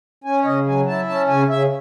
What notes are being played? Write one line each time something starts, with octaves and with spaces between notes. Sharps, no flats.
C#4 G#5
C#5
C#3 D#5
F#3 G#5
E4 A5
C#4 A5
C#3 G#5
C#3 E5